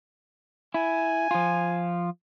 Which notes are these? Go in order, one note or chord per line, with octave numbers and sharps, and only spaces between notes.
E4 G#5
F3 F4